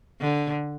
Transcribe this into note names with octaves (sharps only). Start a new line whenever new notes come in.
D3